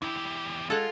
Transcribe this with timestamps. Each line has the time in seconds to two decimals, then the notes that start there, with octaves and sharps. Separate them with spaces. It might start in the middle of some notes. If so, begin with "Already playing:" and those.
0.02 E2 E4 G4
0.70 G#3 F4 A4 F#5